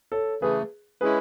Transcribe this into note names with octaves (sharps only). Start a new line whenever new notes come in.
A4 C#5
C#3 E3 A3 G#4 B4
G#3 C#4 E4 G#4 B4